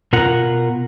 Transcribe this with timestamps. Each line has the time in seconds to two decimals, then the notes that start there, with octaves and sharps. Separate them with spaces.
0.13 B2 F4 A#4 F#5